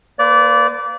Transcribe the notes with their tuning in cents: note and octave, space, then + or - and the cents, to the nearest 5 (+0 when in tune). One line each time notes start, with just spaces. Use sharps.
A#3 +0 B4 +35 D5 -20